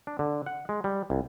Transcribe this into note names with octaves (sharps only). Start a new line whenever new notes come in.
D4
D3
F#5
G#3
G3
C2